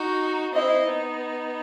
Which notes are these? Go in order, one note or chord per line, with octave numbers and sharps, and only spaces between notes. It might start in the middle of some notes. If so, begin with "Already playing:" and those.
Already playing: D#4 F#4
C4 E4 D#5
B3 D#4